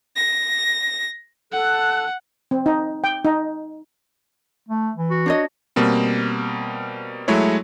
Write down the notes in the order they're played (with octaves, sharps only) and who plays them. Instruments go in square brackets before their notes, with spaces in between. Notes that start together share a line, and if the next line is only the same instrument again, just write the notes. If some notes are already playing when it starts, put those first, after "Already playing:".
[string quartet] A#6
[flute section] A4 A5 F#6 [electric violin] F#5
[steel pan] C4
D#4
G5
D#4
[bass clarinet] A3
E3
[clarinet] F#4
[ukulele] D4 C#5 D#5
[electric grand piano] B2 G3 A#3 C4
F#3 G#3 A3 E4 C#5